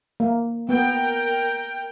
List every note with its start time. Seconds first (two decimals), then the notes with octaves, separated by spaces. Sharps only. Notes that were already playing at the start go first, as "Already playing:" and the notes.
0.20 A#3
0.69 B3 A#4 G5